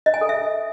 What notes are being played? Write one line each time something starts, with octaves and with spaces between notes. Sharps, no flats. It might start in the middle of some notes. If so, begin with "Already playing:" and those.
D#5
G#5
A4
E5